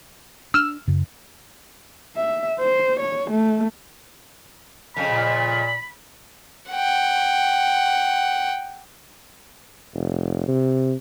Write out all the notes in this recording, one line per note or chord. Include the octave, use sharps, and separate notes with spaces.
D4 E6 F6 E7
F#2 C#3
E5
C5
C#5
A3
F2 C#3 B5
A#2
F#5 G5
F1
C3